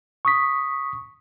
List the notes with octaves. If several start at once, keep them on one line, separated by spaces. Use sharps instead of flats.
C#6 D#6 B6